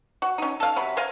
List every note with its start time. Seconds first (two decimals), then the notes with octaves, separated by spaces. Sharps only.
0.22 F#4
0.38 C#4 D#4
0.60 A4 F5
0.76 C3 F#3 B5
0.97 A#4 C5 F5 G#5